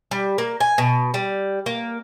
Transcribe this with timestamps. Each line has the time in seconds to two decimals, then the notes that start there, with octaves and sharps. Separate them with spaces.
0.11 G3
0.38 A#3
0.60 G#5
0.78 B2
1.14 G3
1.66 A#3